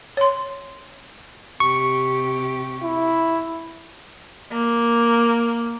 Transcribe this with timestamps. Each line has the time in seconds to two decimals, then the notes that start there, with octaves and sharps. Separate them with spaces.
0.17 C#5 C6
1.60 C3 G4 C#6
2.83 E4
4.52 A#3